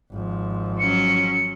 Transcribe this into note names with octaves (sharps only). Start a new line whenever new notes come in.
G#1 F3
F#3 C#4 C#7